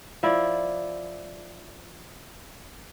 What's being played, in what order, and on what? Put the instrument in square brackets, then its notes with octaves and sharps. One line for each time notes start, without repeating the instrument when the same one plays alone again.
[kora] F3 E4 D5